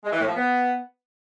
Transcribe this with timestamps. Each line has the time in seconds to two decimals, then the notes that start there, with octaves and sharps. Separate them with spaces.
0.04 G#3
0.12 E3
0.20 A2
0.28 F3
0.36 B3